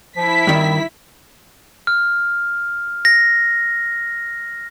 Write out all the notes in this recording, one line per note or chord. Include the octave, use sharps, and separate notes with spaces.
F3 E4 B6
G2 D#3 C4
F6
A#6